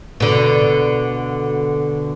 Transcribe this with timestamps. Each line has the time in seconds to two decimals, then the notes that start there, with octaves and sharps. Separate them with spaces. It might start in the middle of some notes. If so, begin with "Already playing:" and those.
0.20 B2 D3